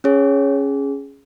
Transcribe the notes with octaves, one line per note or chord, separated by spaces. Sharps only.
C#4 G#4 C#5